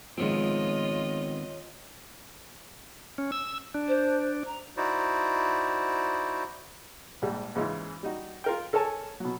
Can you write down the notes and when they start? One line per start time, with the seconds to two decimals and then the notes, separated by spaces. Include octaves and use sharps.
0.18 D#3 F3 G#3 B3 C4 F4 C#5 D#5
3.18 C#4
3.32 E6
3.74 D4
3.87 C5
4.46 A#5
4.77 D#4 E4 F#4 C5 D5
7.22 A#1 G#2 G3
7.55 G#2 C#3 E3 C#4 D#4 F4
8.03 G3 D#4 F#4
8.44 F4 A#4 G5
8.73 A4 A#4 C#5 G#5 A5
9.20 B2 F#3